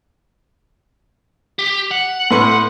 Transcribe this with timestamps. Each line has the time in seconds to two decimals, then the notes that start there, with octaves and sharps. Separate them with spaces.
1.59 G4
1.91 F#5
2.31 A2 B4 C6